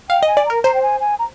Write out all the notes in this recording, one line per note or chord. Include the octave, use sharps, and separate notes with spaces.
F5 G5
D#5 G#5
D5
A#4 A#5
C5 A#5
G5
G#5
G#5
A#5